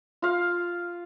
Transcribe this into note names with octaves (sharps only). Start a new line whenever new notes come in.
F4 F5